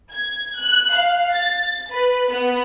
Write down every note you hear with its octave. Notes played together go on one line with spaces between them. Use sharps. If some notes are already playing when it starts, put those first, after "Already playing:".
G#6
F#6
F5
A6
B4
B3